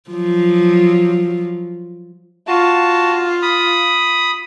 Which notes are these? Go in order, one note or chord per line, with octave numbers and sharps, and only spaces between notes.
F3 F#3
F4 F#4 A5
B5 D#6